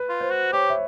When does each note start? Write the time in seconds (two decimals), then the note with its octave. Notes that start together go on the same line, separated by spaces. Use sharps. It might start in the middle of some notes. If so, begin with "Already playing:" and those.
Already playing: B4
0.09 F4
0.20 C5
0.31 F#4
0.53 G4 C#5
0.70 E5